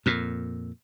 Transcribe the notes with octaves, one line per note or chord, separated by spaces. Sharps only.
F2 A#2